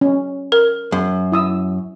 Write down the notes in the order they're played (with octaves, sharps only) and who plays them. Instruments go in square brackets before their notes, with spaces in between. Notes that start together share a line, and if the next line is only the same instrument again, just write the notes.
[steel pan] C#4
[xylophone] A#4
[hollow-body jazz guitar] F#2
[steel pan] E4 D#6 E6